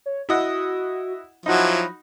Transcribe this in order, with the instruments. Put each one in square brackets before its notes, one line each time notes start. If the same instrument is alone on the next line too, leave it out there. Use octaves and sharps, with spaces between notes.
[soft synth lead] C#5
[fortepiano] E4 D#5 F#5 [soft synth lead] F#4
[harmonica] F3 F#3 E4 [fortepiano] D#4 F#4 [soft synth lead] B5